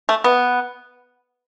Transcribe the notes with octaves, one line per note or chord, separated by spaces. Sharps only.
A3
B3